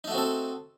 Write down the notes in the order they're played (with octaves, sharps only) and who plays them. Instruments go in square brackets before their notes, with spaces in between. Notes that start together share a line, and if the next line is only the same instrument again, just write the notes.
[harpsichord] D#4
A3
F#4
C4
A4